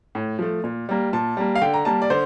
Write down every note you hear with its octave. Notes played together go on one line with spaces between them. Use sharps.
A2
F3 A3
A#2
G3 A#3
A#2 A5
G3 A#3
F5
D3 G5
A#5
G3 A#3 A5
D5
D3 C5